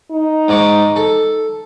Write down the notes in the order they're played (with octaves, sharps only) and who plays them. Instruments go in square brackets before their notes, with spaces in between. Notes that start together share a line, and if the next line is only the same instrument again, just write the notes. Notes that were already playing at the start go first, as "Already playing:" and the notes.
[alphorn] D#4
[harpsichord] G#2 D5 C#6
A4